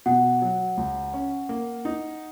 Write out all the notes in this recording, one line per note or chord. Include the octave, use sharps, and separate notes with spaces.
B2 F#5
F#3
C#2
C#4
A#3
D#4